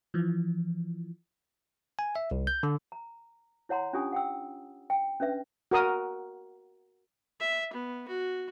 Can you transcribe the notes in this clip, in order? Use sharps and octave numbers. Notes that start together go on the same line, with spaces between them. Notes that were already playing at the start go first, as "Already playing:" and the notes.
E3 F3
G#5
E5
C2
G6
D3
A#5
E4 C#5 F#5 A#5 C6
C#4 D4 F4 G4 G#5 D#6
F#5 G5 E6
G5
C#4 D4 B4 E5
F#4 A#4 D#6
E5
B3
F#4